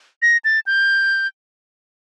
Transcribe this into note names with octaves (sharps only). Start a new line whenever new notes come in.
A#6
A6
G6